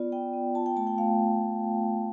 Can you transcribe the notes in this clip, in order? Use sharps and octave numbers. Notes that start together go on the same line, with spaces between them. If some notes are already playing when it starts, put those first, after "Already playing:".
Already playing: B3 F4 D5
B3 G5
B3
F4 A5
G5
A3 A5
G5
A3 F5